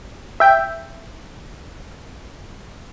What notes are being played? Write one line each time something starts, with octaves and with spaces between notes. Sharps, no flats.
E5 G5